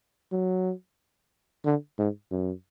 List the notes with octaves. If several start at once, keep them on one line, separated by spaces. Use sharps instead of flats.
F#3
D3
G#2
F#2